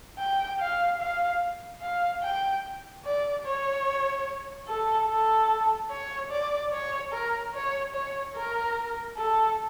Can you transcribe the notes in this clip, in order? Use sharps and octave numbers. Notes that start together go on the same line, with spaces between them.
G5
F5
F5
F5
G5
D5
C#5
A4
A4
C#5
D5
C#5
A#4
C#5
C#5
A#4
A4